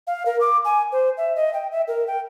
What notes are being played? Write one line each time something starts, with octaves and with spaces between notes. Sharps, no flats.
F5
A#4
D6
G#5
C5
E5
D#5
G5
E5
A#4
G5